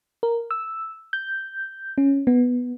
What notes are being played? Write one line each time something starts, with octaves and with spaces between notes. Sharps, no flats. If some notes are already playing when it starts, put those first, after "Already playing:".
A#4
E6
G6
C#4
B3